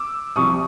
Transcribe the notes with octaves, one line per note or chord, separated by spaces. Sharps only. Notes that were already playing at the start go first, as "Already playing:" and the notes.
Already playing: D6 E6
C2 C3 F3 C#6 D#6